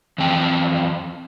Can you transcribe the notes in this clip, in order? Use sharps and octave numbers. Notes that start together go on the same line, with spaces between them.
F2 E3 C4 G5